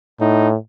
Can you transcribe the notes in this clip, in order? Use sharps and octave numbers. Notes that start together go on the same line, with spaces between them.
A2 D#4